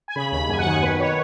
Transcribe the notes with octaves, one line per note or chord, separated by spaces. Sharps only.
G#5
C#3 B5
D#2 B5
F#2 G#5
F#5
D#3 G#5
B2 B4
C#5